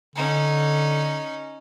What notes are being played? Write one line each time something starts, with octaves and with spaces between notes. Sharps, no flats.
D3 C#4 D#4